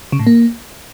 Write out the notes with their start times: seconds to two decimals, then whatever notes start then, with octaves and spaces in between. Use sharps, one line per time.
0.12 C#3
0.20 A2
0.27 A#3